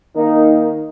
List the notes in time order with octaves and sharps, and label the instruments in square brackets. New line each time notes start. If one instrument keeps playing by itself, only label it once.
[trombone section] D#3 A#3 D#4